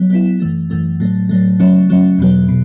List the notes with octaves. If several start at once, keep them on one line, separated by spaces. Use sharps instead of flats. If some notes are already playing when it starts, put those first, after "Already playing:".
Already playing: F#3 B3
F#3 B3 E4
F#2 E3 A3
F#2 E3 A3
A2 F#3 A3
A2 F#3 A3
C#3 F#3 A3 C#4
C#3 F#3 A3 C#4
E2 B2 F#3
B2